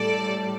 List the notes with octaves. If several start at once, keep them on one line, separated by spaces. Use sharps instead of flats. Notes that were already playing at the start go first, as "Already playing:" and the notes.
Already playing: A2 G3 A4 D5